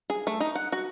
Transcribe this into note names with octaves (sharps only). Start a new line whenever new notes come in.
G#4
A3
D#4
F#5
F#4